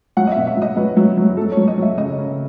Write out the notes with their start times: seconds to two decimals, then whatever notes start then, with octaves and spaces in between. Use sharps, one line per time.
0.17 F#3 F#5
0.27 D#5
0.32 B2 E5
0.47 E5
0.57 F#3 D#5
0.76 F#3 B4
0.97 F#3
1.17 F#3
1.37 F#3 A4
1.52 C#5
1.57 F#3
1.68 D#5
1.77 F#3 E5
1.97 C#3 D#5
2.18 C#3